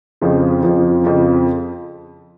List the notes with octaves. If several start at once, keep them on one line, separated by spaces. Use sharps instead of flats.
F2 C#3 F3
F2 C#3 F3
F2 C#3 F3